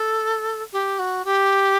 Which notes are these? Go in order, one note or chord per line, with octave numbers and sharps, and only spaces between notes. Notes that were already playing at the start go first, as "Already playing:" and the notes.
Already playing: A4
G4
F#4
G4